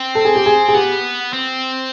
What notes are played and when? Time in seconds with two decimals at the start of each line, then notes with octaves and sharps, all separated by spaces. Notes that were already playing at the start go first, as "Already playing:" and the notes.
Already playing: C4
0.15 A4
0.25 G#4
0.35 G4
0.46 G#4
0.69 G#4
0.74 B3 G4
1.33 C4